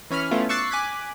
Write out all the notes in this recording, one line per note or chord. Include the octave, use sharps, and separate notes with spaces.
E3 C#4 B5 F6
A3 B3 C#4 E4 F4
C#6 D6 E6 F#6 A6 C7
G#5 D6 F#6 G#6 B6